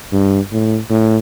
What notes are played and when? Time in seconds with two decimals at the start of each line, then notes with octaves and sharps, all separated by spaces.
0.13 G2
0.52 A2
0.90 A2